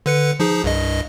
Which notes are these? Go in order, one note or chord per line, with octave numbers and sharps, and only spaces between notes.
D3 B4 C#7
F3 D#4 G#4
C2 G2 D#5